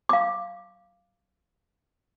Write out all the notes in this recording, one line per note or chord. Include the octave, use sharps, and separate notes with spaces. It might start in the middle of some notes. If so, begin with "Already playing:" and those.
F5 D6